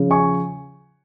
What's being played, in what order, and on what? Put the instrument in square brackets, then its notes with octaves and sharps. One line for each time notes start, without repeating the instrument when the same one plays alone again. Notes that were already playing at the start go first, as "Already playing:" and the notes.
Already playing: [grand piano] C#3 F3 C#4
G#5 C#6